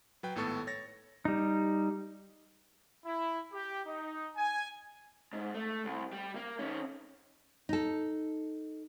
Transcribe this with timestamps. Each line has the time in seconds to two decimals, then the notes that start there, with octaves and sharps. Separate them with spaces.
0.23 F#3 B4 G5
0.36 G#1 A2 B3 A4 C#6 A6
0.67 C#5 A6 A#6
1.25 G3 D#4
3.06 E4
3.53 G4
3.86 D#4
4.36 G#5
5.33 G#2
5.55 A3
5.85 C2
6.13 G3
6.36 A#3
6.59 D#3 C#4
7.69 D#4 A4